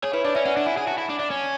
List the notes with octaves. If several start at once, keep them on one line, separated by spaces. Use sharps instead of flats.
G#4 C#5
E4 B4
D4 D5
C#4 E5
C#4 F#5
D4
E4 G#5
G#4
F#4 A5
E4
D4
D4
C#4